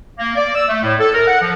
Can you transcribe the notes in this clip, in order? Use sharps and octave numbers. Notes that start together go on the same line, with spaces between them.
A#3
D5
E6
A3
A2
A4
A#4
F#5
F3